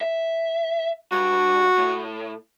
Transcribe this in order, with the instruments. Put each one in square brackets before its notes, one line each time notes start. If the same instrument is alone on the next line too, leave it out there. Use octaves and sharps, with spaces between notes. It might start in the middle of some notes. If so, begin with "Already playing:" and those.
[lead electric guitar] E5
[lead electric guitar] G2 [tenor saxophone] F#4
[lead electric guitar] A2